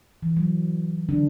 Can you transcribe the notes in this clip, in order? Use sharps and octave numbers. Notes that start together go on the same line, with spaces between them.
E3
F#3
D3 D4